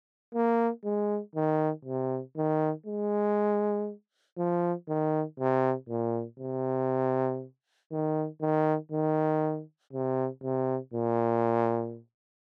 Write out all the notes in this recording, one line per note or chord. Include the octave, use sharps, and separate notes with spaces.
A#3
G#3
D#3
C3
D#3
G#3
F3
D#3
C3
A#2
C3
D#3
D#3
D#3
C3
C3
A#2